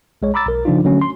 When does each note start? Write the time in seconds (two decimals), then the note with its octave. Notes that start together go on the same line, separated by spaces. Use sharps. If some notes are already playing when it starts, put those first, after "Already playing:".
0.22 B1 G#3 C#5
0.34 A#5 B5 D6 E6 A6
0.47 B1 A#4
0.65 C#3 F3 D4 D#4 F4
0.84 D3 F#3 A3 C#4
1.01 C6